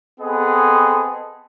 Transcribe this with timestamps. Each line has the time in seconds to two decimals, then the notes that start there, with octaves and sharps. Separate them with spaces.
0.21 B3 C4 G#4 A4 D#5